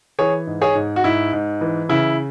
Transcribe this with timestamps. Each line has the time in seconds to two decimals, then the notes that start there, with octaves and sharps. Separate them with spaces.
0.19 E3 G#4 C#5
0.47 G#2
0.61 G#4 C#5
0.75 G#2
0.96 F#4
1.04 G#2 E4
1.33 G#2
1.61 E3
1.89 C#3 E4